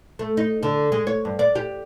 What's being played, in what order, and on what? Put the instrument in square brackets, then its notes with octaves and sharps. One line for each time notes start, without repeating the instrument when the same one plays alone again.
[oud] A3
D#4
D3
G#3
C#5
G2
D5
G4